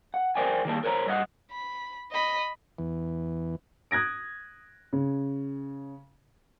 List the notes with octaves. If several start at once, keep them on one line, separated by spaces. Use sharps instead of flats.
F#5
A#4 C5 D5 G5 G#5
D#3 G3 A#3 A5
A#4 C5 C#5 A5 A#5
G2 D#5 F#5
B5
D#5 B5
E2 E3
D#6 F#6 G#6 A#6 D7
C#3